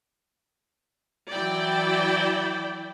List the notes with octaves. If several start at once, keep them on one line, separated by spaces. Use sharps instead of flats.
E3 F#3 E4 D5 G5